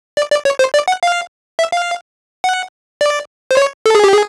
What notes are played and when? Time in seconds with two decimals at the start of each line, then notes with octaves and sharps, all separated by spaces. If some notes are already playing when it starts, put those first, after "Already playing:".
0.17 D5
0.31 D5
0.45 C#5
0.59 C5
0.74 D5
0.88 F#5
1.03 F5
1.59 E5
1.72 F5
2.44 F#5
3.01 D5
3.51 C5
3.57 C#5
3.86 A4
3.95 G#4
4.04 G4
4.13 G#4